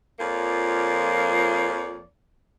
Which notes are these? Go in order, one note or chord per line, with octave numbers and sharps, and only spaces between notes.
F2 F3 A#3 C#5 D5